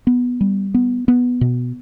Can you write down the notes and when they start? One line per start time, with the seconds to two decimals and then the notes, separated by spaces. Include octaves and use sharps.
0.07 B3
0.41 G3
0.74 B3
1.08 B3
1.41 B2